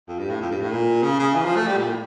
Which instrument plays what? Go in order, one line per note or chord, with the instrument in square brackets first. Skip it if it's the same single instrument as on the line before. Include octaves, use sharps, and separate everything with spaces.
[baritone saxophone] F2
G2
A2
F2
G2
A2
A#2
C#3
C#3
E3
F3
A3
G3
A#2
A2